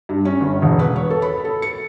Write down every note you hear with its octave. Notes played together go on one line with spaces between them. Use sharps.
G2
C#4
G1
E1
B4
C#5
A4
B5
A4
C#7